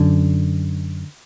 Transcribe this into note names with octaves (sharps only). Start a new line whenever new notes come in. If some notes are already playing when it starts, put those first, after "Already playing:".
Already playing: F#2 D3